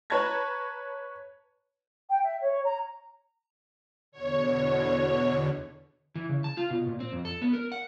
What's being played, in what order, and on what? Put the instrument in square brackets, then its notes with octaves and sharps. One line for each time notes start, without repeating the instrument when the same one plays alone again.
[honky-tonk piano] B4 C#5 A5 A#5 G#6 A#6
[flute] G5
E5
C#5
A#5
[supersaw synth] E2 B2 D3 [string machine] C#5
[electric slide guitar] E3
C#3
A5
F4
B2
A#2
C4
F2
A4
B3
A#4
F#5